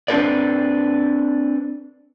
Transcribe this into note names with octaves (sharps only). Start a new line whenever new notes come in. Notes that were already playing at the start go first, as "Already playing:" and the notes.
C4 D4 A4 B4 D5